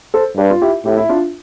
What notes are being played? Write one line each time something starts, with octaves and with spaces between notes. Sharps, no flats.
A4 C5
G2 G4 B4
F4
E4 G4
A2 E4 G4
E4
D4 F4